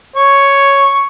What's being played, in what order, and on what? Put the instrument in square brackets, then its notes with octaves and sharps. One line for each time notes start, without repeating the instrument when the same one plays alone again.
[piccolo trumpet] C#5 [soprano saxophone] C#6